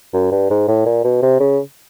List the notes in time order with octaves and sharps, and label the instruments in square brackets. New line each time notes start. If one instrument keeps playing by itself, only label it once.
[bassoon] F#2
G2
G#2
A2
A#2
B2
C3
C#3